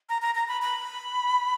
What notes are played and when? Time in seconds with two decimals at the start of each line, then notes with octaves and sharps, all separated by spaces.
0.09 A#5
0.22 A#5
0.35 A#5
0.48 B5
0.62 B5